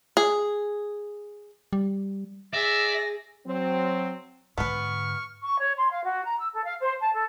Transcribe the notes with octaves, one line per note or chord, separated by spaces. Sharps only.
G#4
G3
G#4 D5 E5 A#6
F#3 C4
G#2 D3 B3 B4 C#6 F6
C#6
C#5
C6
F5
F#4
A#5
E6
A4
F5
C5
A5
A4